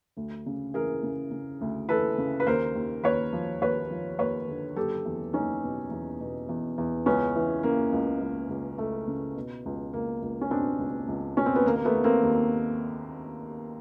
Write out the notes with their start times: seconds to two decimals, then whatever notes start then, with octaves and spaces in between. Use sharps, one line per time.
0.17 D2
0.46 C#3
0.74 E3 G#4 A#4
1.03 C#3
1.31 C#3
1.61 D2
1.89 E3 A4 B4
2.18 C#3
2.40 B4
2.46 D#2 A#4 C5
2.75 D#2
3.04 D#2 B4 C#5
3.33 F3
3.61 D#2 B4 C#5
3.90 F3
4.19 D#2 B4 C#5
4.48 D3
4.76 F#1 G4 A4
5.05 E2
5.33 F#1 C#4 D#4
5.63 B2
5.91 E2
6.20 B2
6.49 E2
6.78 E2
7.06 C#2 B3 C#4
7.36 E3
7.63 C#3 A#3
7.92 C#2
8.21 C#2
8.49 C#2
8.78 C#2 A3
9.07 C#3
9.36 B2
9.65 C#2
9.93 C#2 A#3
10.22 C#2
10.41 C#4
10.50 B2 C4 D4
10.79 C#2
11.08 C#2
11.36 B2 C#4
11.46 C4
11.56 B3
11.65 D#2 A#3
11.76 A#3
11.85 A3 B3
11.95 D#2
12.04 A#3 C4
12.23 D#2